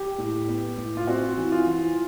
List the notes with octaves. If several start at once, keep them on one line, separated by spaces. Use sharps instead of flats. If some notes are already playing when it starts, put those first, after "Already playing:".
Already playing: G4
A2
B3
A2
F4
C4 F#4
E3
F4
E3